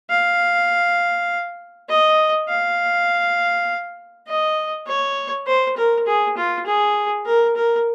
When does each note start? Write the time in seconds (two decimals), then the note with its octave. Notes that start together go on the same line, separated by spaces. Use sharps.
0.10 F5
1.89 D#5
2.49 F5
4.28 D#5
4.87 C#5
5.47 C5
5.77 A#4
6.06 G#4
6.37 F4
6.66 G#4
7.26 A#4
7.56 A#4